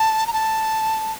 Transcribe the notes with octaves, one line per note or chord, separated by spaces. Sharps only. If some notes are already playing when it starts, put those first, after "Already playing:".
Already playing: A5
A#5
A5